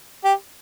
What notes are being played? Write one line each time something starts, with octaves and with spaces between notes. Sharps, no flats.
G4